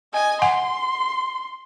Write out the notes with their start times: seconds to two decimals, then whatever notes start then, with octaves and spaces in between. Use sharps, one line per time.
0.13 D#5 G#5
0.42 F#5 G#5 C6